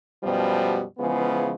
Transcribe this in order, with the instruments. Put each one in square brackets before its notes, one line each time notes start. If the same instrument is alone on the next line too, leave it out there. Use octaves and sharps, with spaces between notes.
[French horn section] F#2 B2 F3 G3
C#3 E3 F3 G#3 B3